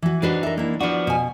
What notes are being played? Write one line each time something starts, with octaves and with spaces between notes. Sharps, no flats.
E3 F#4
E3 D4 D#4 F#4 B4 C5
A#4 E5
A#3 E4
F3 B3 D4 F#4 C5
B2 G#5